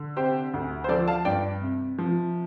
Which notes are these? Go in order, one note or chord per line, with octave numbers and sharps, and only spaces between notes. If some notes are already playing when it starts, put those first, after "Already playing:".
Already playing: D3
C3 G4 C5
D2
C5
F3 A4 D5
F5 A5
G2 D5 G5
C3
F3